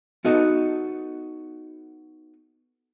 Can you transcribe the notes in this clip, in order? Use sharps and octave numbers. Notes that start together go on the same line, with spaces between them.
B3 D#4 F#4 A4 D#5